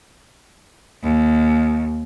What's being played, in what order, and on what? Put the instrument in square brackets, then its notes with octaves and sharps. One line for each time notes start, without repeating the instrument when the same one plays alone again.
[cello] D#2